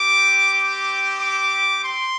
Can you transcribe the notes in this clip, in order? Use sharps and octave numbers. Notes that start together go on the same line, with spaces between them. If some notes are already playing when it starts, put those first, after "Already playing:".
Already playing: C4 G4 D6
D6
D6
C6